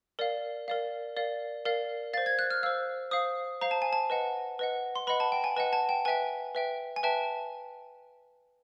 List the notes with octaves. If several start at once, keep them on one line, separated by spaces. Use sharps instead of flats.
A#4 D5 F5
A#4 D5 F5
A#4 D5 F5
A#4 D5 F5
C5 F5 A6
G#6
F#6
F6
C5 F5 E6
C5 F5 D#6
C5 F5 A#5
A5
G#5
A5
B4 D#5 F#5
B4 D#5 F#5
C6
B4 D#5 F#5 B5
A5
G5
G#5
B4 D#5 F#5 A5
A5
G5
B4 E5 G5 G#5
B4 E5 G5
G#5
B4 E5 G5 A5